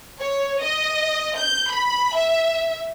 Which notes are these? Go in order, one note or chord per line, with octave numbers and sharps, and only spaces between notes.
C#5
D#5
G6
B5
E5